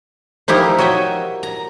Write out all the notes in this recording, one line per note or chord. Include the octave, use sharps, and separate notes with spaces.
F3 D#4 E4 G4 A#4
F#4 C#5 D#5 E5 G5
A#5